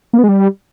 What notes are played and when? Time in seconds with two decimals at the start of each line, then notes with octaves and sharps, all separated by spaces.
0.13 A#3
0.18 B3
0.24 G#3
0.29 G3